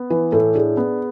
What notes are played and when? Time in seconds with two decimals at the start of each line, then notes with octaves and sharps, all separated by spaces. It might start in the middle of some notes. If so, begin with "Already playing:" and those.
Already playing: B3
0.10 E3 B4
0.32 A2 A4
0.55 D4 G#4
0.77 B3